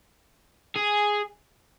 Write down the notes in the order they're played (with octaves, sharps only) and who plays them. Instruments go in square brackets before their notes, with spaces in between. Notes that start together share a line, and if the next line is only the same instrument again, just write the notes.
[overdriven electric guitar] G#4